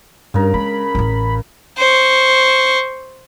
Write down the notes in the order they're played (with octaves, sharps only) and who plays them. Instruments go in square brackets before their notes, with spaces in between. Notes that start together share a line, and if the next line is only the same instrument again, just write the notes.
[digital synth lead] G2 [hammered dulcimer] C#3 A#4
[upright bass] G#3 D4 [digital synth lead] B5
[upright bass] A1 E3
[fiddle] C5 C#6